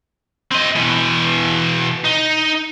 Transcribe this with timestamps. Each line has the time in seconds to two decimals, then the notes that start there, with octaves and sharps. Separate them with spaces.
0.52 C4 D#5
0.76 B2 E3
2.04 D#4